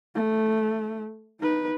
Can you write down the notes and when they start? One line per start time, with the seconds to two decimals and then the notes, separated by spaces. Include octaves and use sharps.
0.15 A3
1.41 D#4 B4